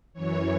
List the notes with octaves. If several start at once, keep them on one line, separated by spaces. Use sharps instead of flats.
F#2 E3 C#5